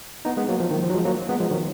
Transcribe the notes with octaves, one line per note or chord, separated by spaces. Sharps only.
B3 D#4
G#3 B3
F#3 A#3
F3
D#3
F3
F#3
F3 G#3
F#3 A#3
G#3 B3
F3 G#3
D#3 F#3